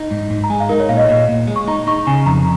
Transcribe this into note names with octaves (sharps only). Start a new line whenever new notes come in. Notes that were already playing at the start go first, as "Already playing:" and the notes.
Already playing: D#4
G#2
G#2
A#5
G#3 G#5
F5
D#4 A#4
C#5
A#2 F5
D#5
C#5
A#2 D#5
A#2
G#3
C#6
D#4 A#5
D#4 C#6
C#3 G#5
F2 A#5